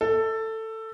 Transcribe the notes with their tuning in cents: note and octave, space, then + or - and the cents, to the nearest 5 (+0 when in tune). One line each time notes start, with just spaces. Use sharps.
A4 +15